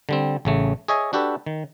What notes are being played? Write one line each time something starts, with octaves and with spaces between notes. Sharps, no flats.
D3 G3 C4
A1 C#3 A3
G#4 C#5 D#5 E5 G#5
D4 F#4 G4 A4 B4
D#3